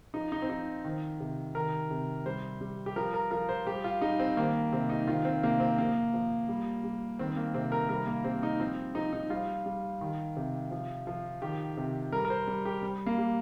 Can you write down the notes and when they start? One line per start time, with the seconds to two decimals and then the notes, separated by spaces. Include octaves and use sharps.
0.14 F3 D#4
0.32 D#4
0.42 C4
0.49 F3 D#4
0.84 D#3
1.20 C3
1.55 D#3 A#4
1.91 C3
2.26 G3 C5
2.61 G3
2.86 G4
2.96 F3 A#4
3.14 A#4
3.31 F3 A#4
3.49 C5
3.67 G3 G4
3.84 F4
4.01 G3 D#4
4.19 C4
4.37 D#3 A#3
4.73 C3 C4
4.89 D#4
5.07 D#3 F4
5.25 C4
5.43 C3 A#3
5.60 C4
5.78 F3 A#3
6.14 F3
6.48 G3
6.84 G3
7.19 D#3 C4
7.37 A#3
7.54 C3 C4
7.72 A#4
7.89 G3 A#4
8.07 A#3
8.24 G3 C4
8.43 D#4
8.60 F3 C4
8.95 F3 D#4
9.13 D#4
9.30 G3 F4
9.66 G3
10.01 D#3
10.37 C3
10.71 F3
11.07 F3
11.42 D#3 G4
11.77 C3
12.12 G3 A#4
12.25 A#4
12.30 C5
12.47 G3
12.65 G4
12.83 G3
13.06 A#3
13.18 G3